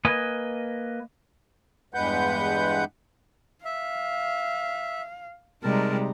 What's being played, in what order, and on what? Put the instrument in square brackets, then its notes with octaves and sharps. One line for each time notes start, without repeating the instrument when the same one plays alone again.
[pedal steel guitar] A#3 B4 D#5 G#5
[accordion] E2 G2 G#3 B4 F#5 G6
[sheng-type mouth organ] E5 [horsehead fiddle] F5
[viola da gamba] C3 G3 G#3 [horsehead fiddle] D#4 [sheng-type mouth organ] A#4 A5